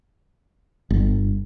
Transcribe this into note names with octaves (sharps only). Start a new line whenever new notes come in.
G1